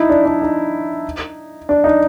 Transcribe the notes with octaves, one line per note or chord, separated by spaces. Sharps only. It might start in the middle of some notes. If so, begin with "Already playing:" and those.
Already playing: D#4 E4
D4
D4
D#4
D4
D#4